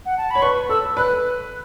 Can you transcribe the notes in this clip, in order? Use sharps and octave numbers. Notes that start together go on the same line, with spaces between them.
F#5
A5
C#5 B5
B4 C#6
A4 E6
B4 F#6